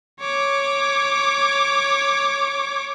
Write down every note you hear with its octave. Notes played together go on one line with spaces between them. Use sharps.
C#5 D6